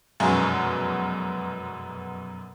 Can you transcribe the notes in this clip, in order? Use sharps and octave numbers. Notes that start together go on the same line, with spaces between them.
F1 F#2 B2 G#3 G#5 C#6